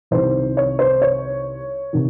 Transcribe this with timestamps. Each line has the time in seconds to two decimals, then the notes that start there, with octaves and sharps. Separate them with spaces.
0.11 C2 C3 D#3 C5
0.57 C#5
0.79 C5
1.02 C#5
1.93 C3 D#3